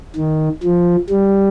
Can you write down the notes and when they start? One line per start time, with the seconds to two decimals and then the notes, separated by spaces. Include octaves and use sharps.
0.16 D#3
0.63 F3
1.10 G3